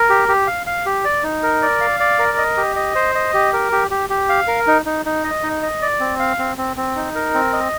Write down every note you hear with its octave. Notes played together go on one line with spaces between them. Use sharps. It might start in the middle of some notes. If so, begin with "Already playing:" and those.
Already playing: A#4
G4
G4
F5
F5
G4
D5
D#4
A#4
D5
F5
D5
A#4
D#5
G4
D#5
C5
D#5
G4
A#4
G4
G4
G4
F5
A#4
D#4
D#4
D#4
D#5
D#4
D#5
D5
C4
F5
C4
C4
C4
D#4
A#4
C4
D#5